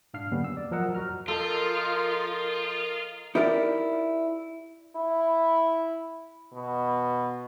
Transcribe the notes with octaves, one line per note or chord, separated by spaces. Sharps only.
G#2 D4 F5 F6 C7
D3 F#3 G3 A#3 B3 C#4
E6
D5
F3 F#3 A#4 D#5 F#5 E6
F2 F#4 A#5 F6
F3 F4 A4 A#4 D#5
D#4 E4 G4 A#4 C#5 D5
E4
B2